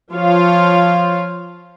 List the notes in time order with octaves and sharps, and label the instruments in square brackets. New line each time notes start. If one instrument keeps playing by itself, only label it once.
[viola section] F3 F4 C#5 F5